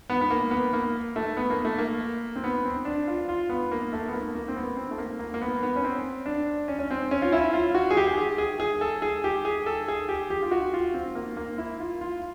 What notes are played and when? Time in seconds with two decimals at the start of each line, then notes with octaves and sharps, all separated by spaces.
0.10 B3
0.21 B3
0.30 A#3
0.51 B3
0.73 A#3
1.16 A3
1.37 B3
1.50 A#3
1.65 A3
1.78 A#3
2.36 C4
2.44 B3
2.65 C4
2.85 D4
3.07 F4
3.29 F4
3.49 B3
3.71 A#3
3.93 A3
4.08 B3
4.13 A#3
4.35 A#3
4.48 C4
4.56 B3
4.77 C4
4.91 A3
4.98 A#3
5.19 A#3
5.34 A#3
5.42 B3
5.63 B3
5.76 C#4
5.84 C4
6.26 D4
6.68 C#4
6.79 C#4
6.91 C4
7.11 C#4
7.22 F4
7.32 E4
7.53 F4
7.74 F#4
7.91 G#4
7.97 G4
8.07 G4
8.18 G#4
8.38 G#4
8.60 G#4
8.81 A4
9.02 G#4
9.24 G4
9.45 G#4
9.66 A4
9.88 G#4
10.09 G4
10.30 G4
10.42 F4
10.51 F#4
10.74 F4
10.94 C4
11.15 A#3
11.37 A#3
11.58 E4
11.80 F4
12.01 F4